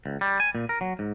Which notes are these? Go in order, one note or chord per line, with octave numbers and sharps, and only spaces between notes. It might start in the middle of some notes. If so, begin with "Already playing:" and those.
C#2
G3
G#5
A#2
A#4
F#3
G#2